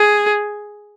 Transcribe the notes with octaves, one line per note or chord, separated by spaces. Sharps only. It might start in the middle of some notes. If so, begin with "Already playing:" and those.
Already playing: G#4